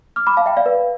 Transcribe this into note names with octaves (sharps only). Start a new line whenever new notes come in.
D6 F6
B5 D6
F5 A5
E5 G5
D5 F5
B4